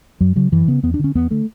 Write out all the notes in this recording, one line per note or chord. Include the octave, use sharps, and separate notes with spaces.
F#2 F#3
C#3 F#3
F#2 E3
C#3 B3
E2 B3
D4
D3 C#4
E2 B3
D3 A3